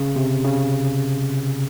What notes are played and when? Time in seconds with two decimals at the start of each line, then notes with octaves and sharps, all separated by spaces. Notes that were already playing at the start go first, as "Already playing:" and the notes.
Already playing: C#3
0.16 C3
0.45 C#3